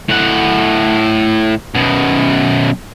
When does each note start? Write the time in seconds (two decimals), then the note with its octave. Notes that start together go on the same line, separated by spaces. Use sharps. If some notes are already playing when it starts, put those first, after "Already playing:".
0.09 A2 F#5
1.75 F#2 B2